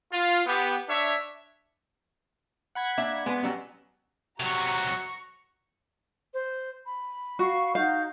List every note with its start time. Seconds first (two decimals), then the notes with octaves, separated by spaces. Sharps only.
0.13 F4
0.46 B3 G4
0.89 D4 C#5 E5
2.75 F#5 B5 G#6
2.98 A#3 D4 E5
3.26 G#3 B3 B4
3.43 F#3 G3 C#4
4.40 C3 F#3 F#4 A#5 C#6
6.34 C5
6.86 B5
7.39 F#4 F5 C#6
7.75 D#4 F#4 F5 G6